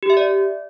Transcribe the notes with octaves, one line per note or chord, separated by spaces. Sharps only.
G4
E5
D5